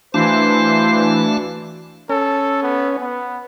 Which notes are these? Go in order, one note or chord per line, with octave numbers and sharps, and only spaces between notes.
E3 A3 D4 F#4 C5 F5
C#4 A4
B3
B3